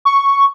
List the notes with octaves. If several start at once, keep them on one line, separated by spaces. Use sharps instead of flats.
C#6